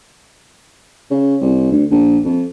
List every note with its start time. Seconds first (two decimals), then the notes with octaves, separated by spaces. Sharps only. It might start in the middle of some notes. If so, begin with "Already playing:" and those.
1.11 C#3
1.41 C2
1.72 D2
1.91 A#1
2.25 F2